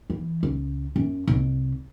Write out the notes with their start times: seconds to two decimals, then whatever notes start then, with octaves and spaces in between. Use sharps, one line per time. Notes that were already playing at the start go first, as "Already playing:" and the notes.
0.10 E3
0.43 C#2
0.96 F#2
1.27 C2